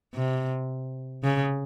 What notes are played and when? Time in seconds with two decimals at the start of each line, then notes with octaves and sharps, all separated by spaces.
0.15 C3
1.24 C#3